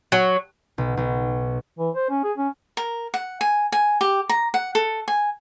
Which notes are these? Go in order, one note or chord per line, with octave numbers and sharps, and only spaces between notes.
F#3
B1
B1
E3
C5
C#4
G#4
C#4
A#4
F#5
G#5
G#5
G4
A#5
F#5
A4
G#5